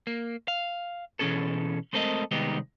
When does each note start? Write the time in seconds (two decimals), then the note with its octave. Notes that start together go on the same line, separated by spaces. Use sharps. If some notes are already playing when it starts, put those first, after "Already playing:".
0.07 A#3
0.48 F5
1.19 B2 E3 C4 C#4 G#4 A4
1.93 G#3 A3 C4 A4 A#4 D#5
2.31 C2 D#3 G#3 B3 D#4 G4